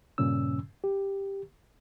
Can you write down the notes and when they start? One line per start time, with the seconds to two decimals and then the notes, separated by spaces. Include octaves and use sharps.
0.18 G2 A#2 C#3 C#4 E6
0.84 G4